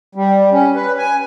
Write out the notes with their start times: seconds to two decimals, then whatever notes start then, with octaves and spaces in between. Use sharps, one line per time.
0.15 G3
0.52 C#4
0.76 B4
0.98 G#5